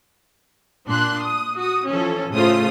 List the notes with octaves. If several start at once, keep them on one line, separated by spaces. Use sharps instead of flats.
A#2 D4 C6 F#6
D#6
F#4 D#6
E3 F3 C#4 A4
A2 C#3 A3 F4 C5 D#6